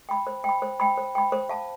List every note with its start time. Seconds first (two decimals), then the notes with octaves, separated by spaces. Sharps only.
0.09 G5 B5
0.27 C5
0.44 G5 B5
0.62 C5
0.80 G5 B5
0.98 C5
1.15 G5 B5
1.32 C5
1.49 F5 A5